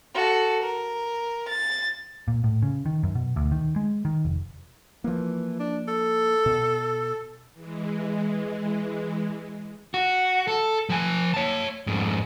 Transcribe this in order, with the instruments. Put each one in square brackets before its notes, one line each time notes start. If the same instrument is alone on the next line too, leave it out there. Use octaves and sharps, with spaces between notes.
[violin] F#4 A4
A#4
A6
[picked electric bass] A#2
A2
C#3
D#3
F#2
B2
D2
D#3
G#3
D#3
F1
[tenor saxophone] E3 [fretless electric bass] F3 A#3
[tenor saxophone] D4
A4
[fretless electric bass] B2
[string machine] E3 G#3
[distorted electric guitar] F#4
A4
F3 G#5
C#5 A5
F2 G#2